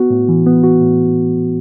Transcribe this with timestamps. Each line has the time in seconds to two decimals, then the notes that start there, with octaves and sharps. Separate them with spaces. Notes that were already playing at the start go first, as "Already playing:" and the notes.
Already playing: B3 F#4
0.10 A2
0.29 E3
0.46 B3
0.64 F#4
0.81 A2